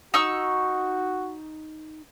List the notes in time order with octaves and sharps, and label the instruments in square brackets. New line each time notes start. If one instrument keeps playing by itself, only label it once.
[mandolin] D#4 C#6 E6 [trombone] F#4